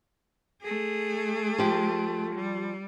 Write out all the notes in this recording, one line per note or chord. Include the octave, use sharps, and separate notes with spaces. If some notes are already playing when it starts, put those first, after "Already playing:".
A3 G#4
F3 G4
G3